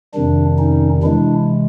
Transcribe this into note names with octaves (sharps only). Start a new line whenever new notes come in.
F2 C3 D#3 G3 D4
C#4 D#4
C3 E3 G#3 D4 E4